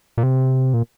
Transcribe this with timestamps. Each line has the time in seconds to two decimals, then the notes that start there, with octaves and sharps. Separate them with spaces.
0.17 A#2
0.23 C3
0.74 A#2